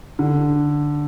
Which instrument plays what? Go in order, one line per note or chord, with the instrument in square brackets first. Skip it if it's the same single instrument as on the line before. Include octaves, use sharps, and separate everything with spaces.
[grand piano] D3